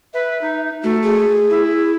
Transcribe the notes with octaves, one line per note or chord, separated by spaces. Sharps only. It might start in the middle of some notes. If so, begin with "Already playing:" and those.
B4 E5
D#4
A3 F#4
G#4
E4